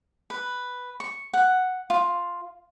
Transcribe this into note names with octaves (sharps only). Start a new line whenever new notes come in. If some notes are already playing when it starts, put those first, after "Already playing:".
B4
C#6
F#5
F4